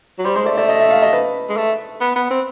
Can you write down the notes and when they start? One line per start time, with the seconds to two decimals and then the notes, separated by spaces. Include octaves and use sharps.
0.19 F#3
0.25 G3 C5
0.35 G#3 C5
0.46 A3 D5
0.57 A3 D5
0.69 D#5
0.80 E5
0.91 F5
1.02 D#5
1.13 B4
1.49 G#3
1.57 A3
2.01 B3
2.16 B3
2.30 C4